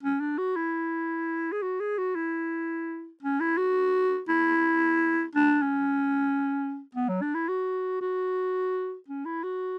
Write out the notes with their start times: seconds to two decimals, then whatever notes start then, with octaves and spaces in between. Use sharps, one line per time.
0.03 C#4
0.20 D4
0.38 F#4
0.56 E4
1.52 G#4
1.62 F#4
1.80 G#4
1.98 F#4
2.16 E4
3.23 C#4
3.40 E4
3.57 F#4
4.28 E4
5.35 D4
5.62 C#4
6.95 B3
7.09 F#3
7.22 D4
7.34 E4
7.49 F#4
8.01 F#4
9.08 C#4
9.26 E4
9.44 F#4